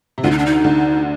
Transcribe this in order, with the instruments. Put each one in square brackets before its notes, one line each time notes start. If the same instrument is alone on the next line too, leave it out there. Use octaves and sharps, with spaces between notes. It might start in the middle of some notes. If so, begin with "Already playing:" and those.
[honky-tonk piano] C3
[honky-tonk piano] D2 D3 [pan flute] F4
[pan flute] D#4
D4
D#4
[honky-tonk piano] D2 D3